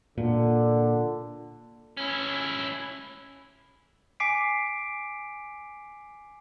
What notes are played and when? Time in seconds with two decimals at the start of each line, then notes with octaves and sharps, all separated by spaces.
0.18 A#2 D3
1.97 C#4 E4
4.20 G#5 D6 B6 C7 D7